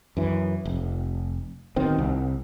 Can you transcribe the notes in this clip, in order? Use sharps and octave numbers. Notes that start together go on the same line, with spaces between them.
F#2 E3
F1
D1 B2 D#3 C4
C2